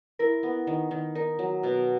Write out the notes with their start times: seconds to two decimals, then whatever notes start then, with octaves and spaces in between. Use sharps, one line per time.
0.19 E4 A#4
0.43 B3
0.67 D#3
0.91 D#3
1.15 D#4 A#4
1.39 F#3
1.63 B2